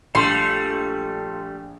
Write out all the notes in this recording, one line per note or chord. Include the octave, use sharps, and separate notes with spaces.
A#1 G3 A3 F4 A4 C6